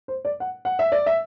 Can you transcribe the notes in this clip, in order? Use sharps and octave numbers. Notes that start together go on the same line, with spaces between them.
C5
D5
F#5
F#5
E5
D5
E5